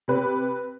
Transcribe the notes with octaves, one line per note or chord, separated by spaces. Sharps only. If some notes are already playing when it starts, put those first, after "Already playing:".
C3 B4